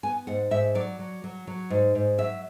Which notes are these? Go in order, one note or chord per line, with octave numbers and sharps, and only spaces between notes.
B3 G#5
G#2 F#5
G#2 E5
F#3 D5
F#3
F#3
F#3
G#2
G#2
F#3 E5